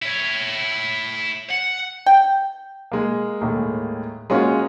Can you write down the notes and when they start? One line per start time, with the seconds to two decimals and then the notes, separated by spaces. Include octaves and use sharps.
0.02 E4 C#5
1.51 F#5
2.06 G5
2.92 G#3 A#3
3.42 D#2 A2 G#3 A#3
4.30 G#3 A#3 C#4 F4 F#4 C#5